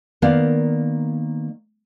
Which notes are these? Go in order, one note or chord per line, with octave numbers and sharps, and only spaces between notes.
D#3 A#3 B3 D5 F5